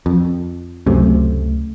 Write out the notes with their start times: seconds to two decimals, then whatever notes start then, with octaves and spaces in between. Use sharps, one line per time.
0.06 F2
0.86 C#2 F#2 C3 A3